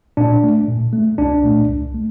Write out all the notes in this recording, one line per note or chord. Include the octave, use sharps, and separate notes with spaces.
A#2 D4
A3
A#2
A3
C2 D4
A#2 A3
C2
A3